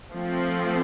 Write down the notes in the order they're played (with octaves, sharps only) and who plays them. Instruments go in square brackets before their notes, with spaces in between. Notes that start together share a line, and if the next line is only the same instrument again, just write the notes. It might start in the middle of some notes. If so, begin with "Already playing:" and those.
[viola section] F3 A3 C4